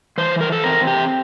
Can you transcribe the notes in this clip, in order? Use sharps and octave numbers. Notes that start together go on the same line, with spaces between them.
E3 C5
A#4
A4
C4 A#4
G4